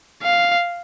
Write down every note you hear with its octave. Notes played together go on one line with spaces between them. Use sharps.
F5